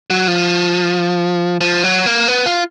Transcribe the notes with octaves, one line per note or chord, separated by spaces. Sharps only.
F#3
F3
F3
F#3
A#3
B3
F4